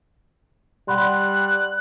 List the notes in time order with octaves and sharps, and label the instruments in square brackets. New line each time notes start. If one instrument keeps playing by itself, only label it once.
[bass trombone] G3 [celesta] F#5 B5 C6 [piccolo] F#6